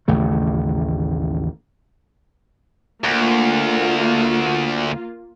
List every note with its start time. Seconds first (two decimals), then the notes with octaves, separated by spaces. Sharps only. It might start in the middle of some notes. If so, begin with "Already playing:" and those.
0.08 A1 D#2 C#3 A3
3.04 D2 A#3 F4